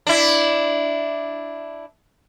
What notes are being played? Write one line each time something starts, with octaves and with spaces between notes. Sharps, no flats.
D4 E4